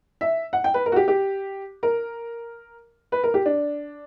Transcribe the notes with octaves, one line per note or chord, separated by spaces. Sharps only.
E5
F#5
G5
B4
A#4
F#4
G4
G4
A#4
B4
A#4
G4
D4